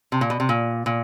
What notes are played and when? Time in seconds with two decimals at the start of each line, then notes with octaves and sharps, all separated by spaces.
0.12 C3
0.21 A#2
0.30 B2
0.40 C3
0.49 A#2
0.86 A#2